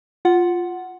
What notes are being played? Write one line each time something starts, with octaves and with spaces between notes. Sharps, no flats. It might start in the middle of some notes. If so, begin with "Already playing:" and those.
F4 F#5